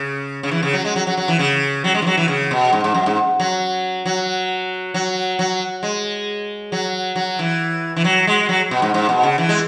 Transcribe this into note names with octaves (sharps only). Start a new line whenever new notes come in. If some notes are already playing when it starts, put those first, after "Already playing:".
Already playing: C#3
C#3
E3
C#3
F#3
G#3
F#3
F#3
F#3
E3
C#3
F#3
G#3
E3
F#3
E3
C#3
B2
G#2
G#2
F#2
G#2
F#3
F#3
F#3
F#3
G#3
F#3
F#3
E3
E3
F#3
G#3
F#3
B2
G#2
G#2
B2
C#3
E3
G#3